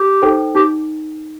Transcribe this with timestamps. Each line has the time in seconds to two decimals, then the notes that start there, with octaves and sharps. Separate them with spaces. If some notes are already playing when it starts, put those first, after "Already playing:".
Already playing: G4
0.22 D#4 A4 C5 G5
0.55 D#4 G4